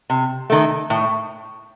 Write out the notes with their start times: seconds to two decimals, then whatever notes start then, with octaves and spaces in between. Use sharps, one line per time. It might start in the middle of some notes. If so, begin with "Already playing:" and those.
0.10 C3
0.50 D#3 A3
0.90 A2